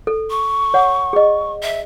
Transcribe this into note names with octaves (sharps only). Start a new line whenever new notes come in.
A4
C#6
C#5 F#5
G#4 D#5
E5